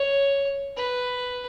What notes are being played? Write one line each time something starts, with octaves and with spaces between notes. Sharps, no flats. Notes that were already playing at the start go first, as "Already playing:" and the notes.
Already playing: C#5
B4